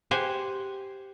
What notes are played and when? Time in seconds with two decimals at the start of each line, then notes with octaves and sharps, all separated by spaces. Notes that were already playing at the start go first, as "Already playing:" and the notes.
0.11 G4 C5 F#5 G#5